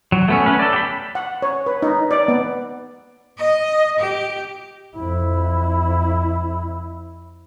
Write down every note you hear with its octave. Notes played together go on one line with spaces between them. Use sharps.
F#3
A3 B3 C#4
C#4 B4
A4 D5
G4 B5
F#5
C#5
B4
D#4
D5
B3
D#5
G4
F2 E4